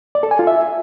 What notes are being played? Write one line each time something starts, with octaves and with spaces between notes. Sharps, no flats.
D5
A4
G#5
F4
E5